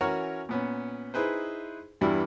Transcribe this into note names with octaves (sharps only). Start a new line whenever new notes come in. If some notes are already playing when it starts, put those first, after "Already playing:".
E3 C#4 F#4 A#4 C#5
A#2 B3 C#4
D#4 E4 G#4 B4 C5
E2 G2 E3 G3 D4 E4